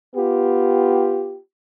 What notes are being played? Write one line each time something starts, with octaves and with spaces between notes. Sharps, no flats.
B3 F4 G4